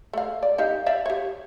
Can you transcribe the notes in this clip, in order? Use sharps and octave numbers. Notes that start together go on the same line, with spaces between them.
A3 F5
D5
D#4 G4 F5
D5 E5 F5
G4 C#5